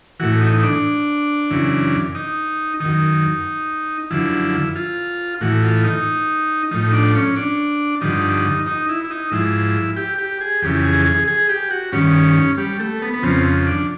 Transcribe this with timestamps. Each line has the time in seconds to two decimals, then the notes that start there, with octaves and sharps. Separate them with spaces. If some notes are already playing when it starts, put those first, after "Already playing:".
0.20 A2 E3 F#4
0.41 D#4
0.58 D#4
0.63 D4
1.51 F#2 C#3 E3
2.15 D#4
2.80 F#2 D#3 D#4
4.10 F#2 D3 F3 E4
4.75 F4
5.41 A2 E3 F#4
5.63 F4
5.84 D#4
6.71 A2 F3 D#4
6.93 D4
7.15 C#4
7.36 D4
8.01 G2 D3 F3 D#4
8.66 D#4
8.89 E4
9.04 E4
9.11 D#4
9.32 G#2 F3 E4
9.97 G4
10.18 G4
10.41 G#4
10.62 F2 C#3 E3 G4
10.84 G#4
11.06 G#4
11.28 G#4
11.49 G4
11.71 F#4
11.92 G2 D#3 C#4
12.58 G3
12.80 A3
13.02 B3
13.14 B3
13.22 F2 C#3 F3 C4
13.67 D4